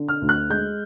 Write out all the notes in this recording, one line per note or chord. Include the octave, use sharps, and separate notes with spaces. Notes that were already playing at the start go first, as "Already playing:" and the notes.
Already playing: D3
F6
D2
F#6
G#3 G6